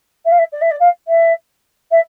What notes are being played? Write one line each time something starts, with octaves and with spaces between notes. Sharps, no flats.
E5
F5
E5
D5
E5
D5
F5
E5
E5